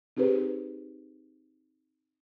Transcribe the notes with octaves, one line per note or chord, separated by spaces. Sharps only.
C4 D#4 G4 G#4 B4 C5